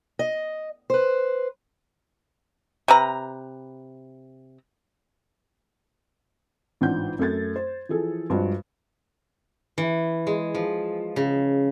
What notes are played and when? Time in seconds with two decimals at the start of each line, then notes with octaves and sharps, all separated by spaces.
0.19 D#5
0.90 B4 C5
2.88 C3 B4 A#5
6.81 A1 G#2 D4 F4 F#5 G6
7.19 F#2 A3 G#6 A6
7.56 C5
7.89 E3 F3 G#4 A4
8.30 G2 F3 G#3 F#4 C5
9.78 E3
10.27 G#3
10.54 F3
11.16 C#3